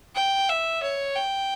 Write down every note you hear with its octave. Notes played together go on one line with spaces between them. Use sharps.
G5
E5
C#5
G5